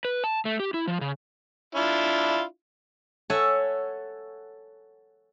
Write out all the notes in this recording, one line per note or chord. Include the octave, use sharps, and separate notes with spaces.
B4
A5
A3
G4
E4
F3
C#3
D4 E4 F4
A4 C#5 E5 F#5 G#5